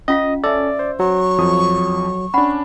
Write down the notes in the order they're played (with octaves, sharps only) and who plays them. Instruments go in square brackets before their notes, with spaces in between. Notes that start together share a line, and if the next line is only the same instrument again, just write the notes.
[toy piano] C#4 F4 F5 [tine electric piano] D#5
[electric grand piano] C#4 A4 [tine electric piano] D5 [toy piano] E5 E6
[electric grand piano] C5
[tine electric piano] F#3 [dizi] C#6
[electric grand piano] F2 F3 D#6
[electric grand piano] C#4 D4 [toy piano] F#5 B5